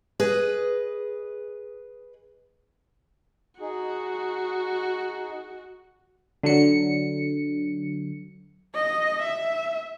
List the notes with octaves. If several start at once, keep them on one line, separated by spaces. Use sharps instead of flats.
G#4 B4 D#5
D#4 F#4 G#4
D3 F#3 C#7
D#5
E5